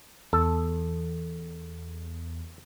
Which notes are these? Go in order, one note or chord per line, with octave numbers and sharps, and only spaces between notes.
E2 A4